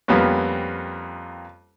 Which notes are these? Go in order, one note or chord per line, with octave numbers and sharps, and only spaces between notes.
F2 G3 A#3 B3 C#4